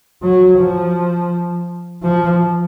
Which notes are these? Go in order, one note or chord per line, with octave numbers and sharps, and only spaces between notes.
F#3
F3
F3